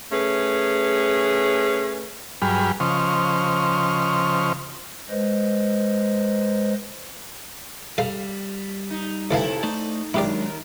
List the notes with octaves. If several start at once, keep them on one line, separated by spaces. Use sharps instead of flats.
A3 C#4 G#4 B4
G2 F#3 G#4 G5 B5 F6
C#3 F3 C5 D#5 C#6 F6
G#3 B4 C5 D#5
G3 A4 F5
D#4
D2 C3 E3 E4 A4 F5
A3 D#4 C5 D5
D#2 F#3 G#3 D4 E4 G4 A#4 D5